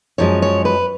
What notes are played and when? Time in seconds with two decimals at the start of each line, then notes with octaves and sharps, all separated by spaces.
0.18 F#2 F3 G#3 C#5
0.42 C#5
0.65 B4